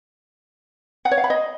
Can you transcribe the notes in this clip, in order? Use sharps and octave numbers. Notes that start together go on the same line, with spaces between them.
F#5
C#5
F5
B5
D#5